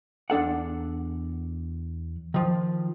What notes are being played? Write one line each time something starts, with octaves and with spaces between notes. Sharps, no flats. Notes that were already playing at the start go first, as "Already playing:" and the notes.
E2 D4 A4 F#5
D#3 F3